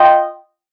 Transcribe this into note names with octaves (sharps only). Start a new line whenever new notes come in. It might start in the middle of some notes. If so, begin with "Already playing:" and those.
Already playing: F4 D#5 G5